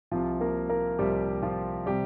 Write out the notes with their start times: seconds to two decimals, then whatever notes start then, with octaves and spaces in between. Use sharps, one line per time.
0.11 C2 C3 F3 F4
0.41 A#3 A#4
0.69 A#3 A#4
0.99 C2 C3 F3 G3 G4
1.42 F3 F4
1.86 C3 G3 G4